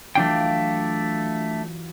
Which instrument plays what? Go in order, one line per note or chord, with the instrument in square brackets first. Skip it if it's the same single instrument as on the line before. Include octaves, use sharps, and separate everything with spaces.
[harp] E3 F#3 F4 [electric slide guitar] A3 D4 G5